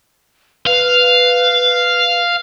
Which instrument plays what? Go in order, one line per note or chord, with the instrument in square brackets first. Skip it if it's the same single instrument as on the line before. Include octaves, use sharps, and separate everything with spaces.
[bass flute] B4 [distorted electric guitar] F5